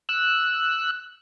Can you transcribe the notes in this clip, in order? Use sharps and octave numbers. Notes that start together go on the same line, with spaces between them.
E6 F#6